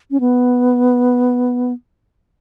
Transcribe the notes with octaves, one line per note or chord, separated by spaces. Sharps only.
C#4
B3